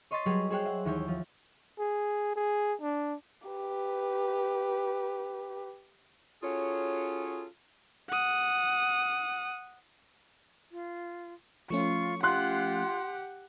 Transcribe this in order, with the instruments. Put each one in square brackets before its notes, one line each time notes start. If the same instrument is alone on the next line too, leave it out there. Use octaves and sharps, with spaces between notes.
[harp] C#5 D#5 C6 C#6 A6 B6
F#3 G3 G4 G#4 B4 C#5
G#4 C5 C#5 G5 F#6
E5 F#5
D#2 E3 C#5 E5 G6
F3
[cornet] G#4
G#4
D4
[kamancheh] G4 B4
[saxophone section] C#4 F4 F#4 G#4 A4 C#5
[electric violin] F#5 D#6
[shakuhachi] F4
[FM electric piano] F3 A3 C#4 [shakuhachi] F4 [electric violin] C#6
[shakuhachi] F4 [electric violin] G4 F#5 [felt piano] C6 F#6